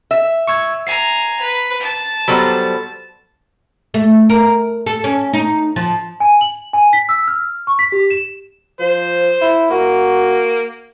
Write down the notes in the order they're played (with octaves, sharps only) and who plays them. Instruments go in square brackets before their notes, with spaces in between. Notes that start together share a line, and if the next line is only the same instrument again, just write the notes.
[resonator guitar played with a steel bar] E5
[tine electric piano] C#6 E6 G#6
[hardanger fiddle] G#5 A#5 [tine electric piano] C7
[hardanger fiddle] B4
A5
[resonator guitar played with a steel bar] F#3 G3 B3 [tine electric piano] A4 C5 B5
[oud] A3
A#4
A4
C#4
D#4
F3
[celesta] G#5
F#7
G#5
B6
E6
F6
C#6
B6
G4
E7
[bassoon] F3 [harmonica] C5
[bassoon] E4
[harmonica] A#3 [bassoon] F#4